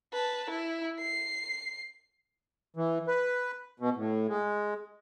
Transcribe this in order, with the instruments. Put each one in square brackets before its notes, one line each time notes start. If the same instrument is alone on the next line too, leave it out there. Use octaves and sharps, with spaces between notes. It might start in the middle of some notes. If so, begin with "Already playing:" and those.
[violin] B4 A5
E4
C7
[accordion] E3
B4
B2
A2
G#3